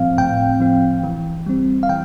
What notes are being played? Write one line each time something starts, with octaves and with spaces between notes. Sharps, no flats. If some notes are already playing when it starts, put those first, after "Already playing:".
Already playing: A2 F3 C4 F5
A2 G5
F3 C4
E3
G3 C4
F5
E3 G5